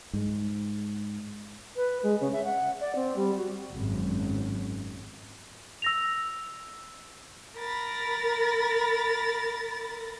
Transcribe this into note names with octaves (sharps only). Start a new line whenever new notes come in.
G#2 G#3
B4
G#3
C#3
E5
F#5
D5
C4
G3
F#4
G#1 F#2
E6 A#6 F7
A#4 B5 A6 A#6